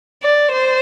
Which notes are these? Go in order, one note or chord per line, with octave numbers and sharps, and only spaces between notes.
D5
C5